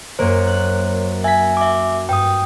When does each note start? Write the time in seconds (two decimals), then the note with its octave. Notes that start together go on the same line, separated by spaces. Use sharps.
0.19 F#2 A#3 C5 C#5
0.47 F#6
1.24 E5 G#5 B6
1.57 E5 D6
2.09 G2 G5 D#6